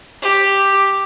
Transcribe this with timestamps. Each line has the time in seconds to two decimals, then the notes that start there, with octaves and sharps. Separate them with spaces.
0.23 G4